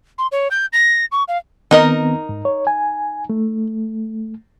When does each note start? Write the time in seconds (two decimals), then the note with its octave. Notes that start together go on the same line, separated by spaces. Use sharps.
0.18 C6
0.32 C#5
0.51 G6
0.73 A#6
1.12 C#6
1.28 F5
1.71 D#3 B3 C4 D#4 A#4 D#5
2.29 G#2
2.45 C#5
2.67 G#5
3.30 A3